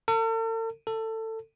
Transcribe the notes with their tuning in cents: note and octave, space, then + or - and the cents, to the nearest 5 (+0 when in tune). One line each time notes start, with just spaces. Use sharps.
A4 +45
A4 +20